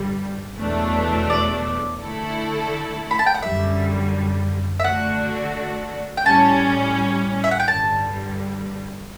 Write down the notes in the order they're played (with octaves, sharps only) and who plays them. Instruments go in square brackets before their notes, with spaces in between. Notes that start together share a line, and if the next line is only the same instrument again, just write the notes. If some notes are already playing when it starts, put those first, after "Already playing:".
Already playing: [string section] G1 G2 D3 G3
E2 B2 F#3 A3 D4
[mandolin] D5
[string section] D3 A3 E4 A4
[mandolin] B5
A5
G5
F#5
[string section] F#2 D3 G3 [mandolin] E5
[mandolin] E5
[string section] D3 A3 D4 F#4 [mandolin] F#5
[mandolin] G5
[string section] A2 G3 C#4 [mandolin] A5
[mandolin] E5
F#5
G5
[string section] G2 D3 G3 [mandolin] A5